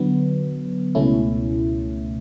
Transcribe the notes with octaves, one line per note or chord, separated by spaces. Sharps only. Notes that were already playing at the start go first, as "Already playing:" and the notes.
Already playing: D3 F#3 B3
C#2 B2 A3 C#4 E4